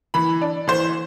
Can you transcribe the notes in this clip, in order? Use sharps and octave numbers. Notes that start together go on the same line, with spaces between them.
E3 B5
D4
E3 C5